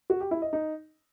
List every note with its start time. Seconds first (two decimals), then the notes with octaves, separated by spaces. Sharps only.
0.10 F#4
0.20 G4
0.31 E4
0.42 D#5
0.53 D#4